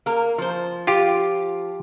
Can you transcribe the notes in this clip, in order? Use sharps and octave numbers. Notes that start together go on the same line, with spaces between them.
A#3 A#4
F3 C5
F4 G4